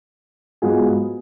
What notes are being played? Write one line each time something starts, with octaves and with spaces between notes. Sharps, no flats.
G#2 F#3 B3 F4 G#4